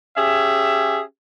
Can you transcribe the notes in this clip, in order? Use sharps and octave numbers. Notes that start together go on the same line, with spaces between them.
C#4 G4 G#4 E5